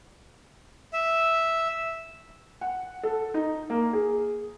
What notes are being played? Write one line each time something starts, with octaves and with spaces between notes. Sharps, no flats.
E5
F#5
A4
D#4
A#3
G#4